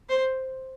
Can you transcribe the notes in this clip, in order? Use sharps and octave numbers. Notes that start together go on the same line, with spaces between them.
C5